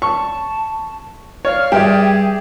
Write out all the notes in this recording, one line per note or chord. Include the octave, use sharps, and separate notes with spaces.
A5 C#6
C#5 D5 F5 F6
G2 G4 G#4 D5 E5 G5